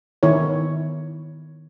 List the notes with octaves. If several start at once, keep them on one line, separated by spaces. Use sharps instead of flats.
D#3 B3 E4 C#5